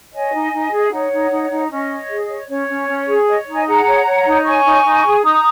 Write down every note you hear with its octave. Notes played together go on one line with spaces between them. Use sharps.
C#5 D#5 G#5
D#4
D#4
G#4
D#4 C#5 F#5
D#4
D#4
D#4
C#4 D#5
C#5
G#4
C#5
C#4 C#5
C#4
C#4
G#4
C#5 D#5
D#4
D#5 G#5
G#4 F#5 A#5
C#5
C#5
D#4
C#5 G#5 C#6
D#4
D#4
G#4
D#4 A#5 D#6